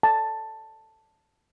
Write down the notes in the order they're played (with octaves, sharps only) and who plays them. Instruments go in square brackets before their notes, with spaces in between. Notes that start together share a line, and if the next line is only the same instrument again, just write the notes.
[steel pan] A5